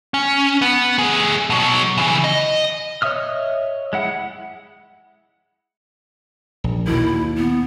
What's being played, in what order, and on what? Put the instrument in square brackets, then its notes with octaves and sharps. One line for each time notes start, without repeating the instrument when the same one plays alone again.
[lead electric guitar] C#4
B3
A3 G#4
B2 F#3
C#3 E3
D#5
[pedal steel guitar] C#5 D#5 E5 D#6 F6
G#3 E4 F#5
[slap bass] A#1
[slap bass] D#2 B2 D#3 [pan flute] E4
[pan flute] B3